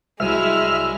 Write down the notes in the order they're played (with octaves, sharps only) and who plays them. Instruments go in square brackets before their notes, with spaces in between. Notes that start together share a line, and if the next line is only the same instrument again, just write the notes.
[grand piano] C2 F#3 D#7 [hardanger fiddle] G#3 E4 [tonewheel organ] E5 F6